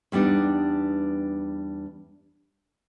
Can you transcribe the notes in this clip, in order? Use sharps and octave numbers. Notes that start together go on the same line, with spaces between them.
E2 G3 B3 D4 D#4